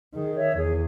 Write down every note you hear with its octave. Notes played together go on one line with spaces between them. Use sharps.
D#3 G#4
C#5 E5
E2 G#4